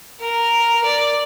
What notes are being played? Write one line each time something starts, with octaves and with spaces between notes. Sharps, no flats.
A#4
D5